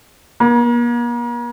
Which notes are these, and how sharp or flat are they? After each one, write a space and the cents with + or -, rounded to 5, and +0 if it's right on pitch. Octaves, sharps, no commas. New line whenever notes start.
A#3 +40